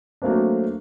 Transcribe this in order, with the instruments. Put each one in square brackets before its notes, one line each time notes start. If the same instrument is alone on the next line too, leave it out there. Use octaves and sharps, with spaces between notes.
[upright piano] F#3 A3 A#3 C4 D4